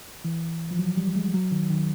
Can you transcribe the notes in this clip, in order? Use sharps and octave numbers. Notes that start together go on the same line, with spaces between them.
E3
F3
F#3
G3
G#3
F#3
D#3
D#3